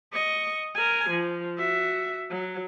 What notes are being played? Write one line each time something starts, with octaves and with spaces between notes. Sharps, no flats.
D#5 C#6
A#4 G#5
F3
F#4 E5
F#3